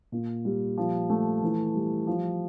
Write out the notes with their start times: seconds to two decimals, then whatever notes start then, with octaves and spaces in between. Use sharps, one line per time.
0.12 A#2
0.45 G3
0.77 F3
1.10 A3
1.43 E3
1.74 G3
2.07 F3